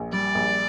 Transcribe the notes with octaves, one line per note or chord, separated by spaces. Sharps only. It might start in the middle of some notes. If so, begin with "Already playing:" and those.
Already playing: A#1
G3 D5
A#1